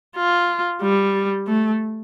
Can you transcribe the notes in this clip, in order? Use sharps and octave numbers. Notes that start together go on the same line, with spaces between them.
F4
G3
A3